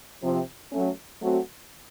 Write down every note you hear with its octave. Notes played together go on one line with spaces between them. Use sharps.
C3 F3 C4
F#3 A3 C#4
F#3 A3 C4 F#4